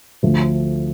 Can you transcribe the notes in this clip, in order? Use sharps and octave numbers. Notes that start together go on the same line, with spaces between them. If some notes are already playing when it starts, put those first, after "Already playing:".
D2 D3 F3 A3